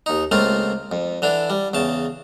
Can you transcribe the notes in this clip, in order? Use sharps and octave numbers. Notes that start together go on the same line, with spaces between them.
D#2 D#4
C#2 A3 A#3 C4 F4
F2
D3 E3 D4
G3
E2 C#3 A5